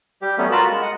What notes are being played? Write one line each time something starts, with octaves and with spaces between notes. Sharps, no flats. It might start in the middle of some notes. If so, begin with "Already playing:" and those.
G3 G4
F#3 G3 A3 B3 C#4
F4 F#4 A#4 A5 B5
G#3
D#5 F#5